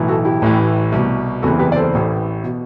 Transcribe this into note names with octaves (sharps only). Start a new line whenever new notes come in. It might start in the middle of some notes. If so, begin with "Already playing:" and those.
Already playing: B1 A2 E3
F#4 A4
E4 G4
A1 A2 E3
C2 B2
F#1 E2 C3 E3 F#4 A4
G4 B4
D5
A4 C5
A1 A2 E3
B2